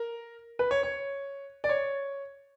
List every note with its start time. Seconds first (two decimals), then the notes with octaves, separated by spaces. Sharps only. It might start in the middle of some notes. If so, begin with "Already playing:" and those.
Already playing: A#4
0.59 B4
0.71 C#5
0.83 C#5
1.64 D5
1.69 C#5